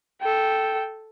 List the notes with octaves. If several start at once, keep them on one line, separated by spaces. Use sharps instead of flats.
A4 G5